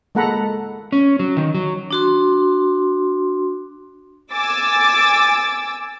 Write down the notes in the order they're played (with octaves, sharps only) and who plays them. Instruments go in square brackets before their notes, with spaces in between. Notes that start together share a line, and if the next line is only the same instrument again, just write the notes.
[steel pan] G#3 A#3 A4 F#5 A#5 B5
[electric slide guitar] C#4
F#3
D#3
F#3
[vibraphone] D4 F#4 C6
[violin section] G#5 D6 E6 A6